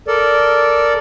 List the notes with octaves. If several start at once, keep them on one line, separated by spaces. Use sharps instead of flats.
A4 A#4 D5